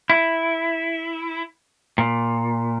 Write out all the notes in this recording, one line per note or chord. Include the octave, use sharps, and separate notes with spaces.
E4
A#2